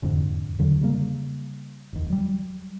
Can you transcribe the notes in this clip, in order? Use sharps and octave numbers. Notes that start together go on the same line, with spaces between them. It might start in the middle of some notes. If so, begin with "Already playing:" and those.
E1 F2 G#2 D3
E2 D3 F#3
C#3 G3 A#3
F1 D#2
F#3 G3